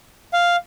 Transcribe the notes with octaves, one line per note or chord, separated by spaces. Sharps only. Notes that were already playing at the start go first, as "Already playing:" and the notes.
F5